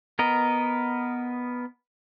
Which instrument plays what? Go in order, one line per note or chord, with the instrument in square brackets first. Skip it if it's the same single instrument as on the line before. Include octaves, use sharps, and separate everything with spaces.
[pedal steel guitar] B3 A#4 D#5